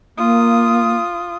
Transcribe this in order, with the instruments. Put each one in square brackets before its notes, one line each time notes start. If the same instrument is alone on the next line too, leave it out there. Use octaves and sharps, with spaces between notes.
[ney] A#3 [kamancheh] F4 D#6